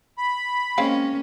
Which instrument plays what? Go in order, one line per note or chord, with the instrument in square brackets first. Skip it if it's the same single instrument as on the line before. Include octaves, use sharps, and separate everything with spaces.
[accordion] B5
[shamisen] G#3 C4 F5 [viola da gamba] A#3 C#4